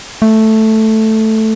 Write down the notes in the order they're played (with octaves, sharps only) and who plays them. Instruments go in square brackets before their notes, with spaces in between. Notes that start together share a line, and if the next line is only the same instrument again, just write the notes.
[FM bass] A3